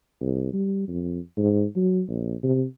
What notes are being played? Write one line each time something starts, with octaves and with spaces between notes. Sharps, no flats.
C2
G3
F2
G#2
F#3
A#1
C3